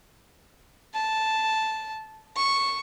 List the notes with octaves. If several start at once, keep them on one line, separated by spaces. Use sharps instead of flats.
A5
C#6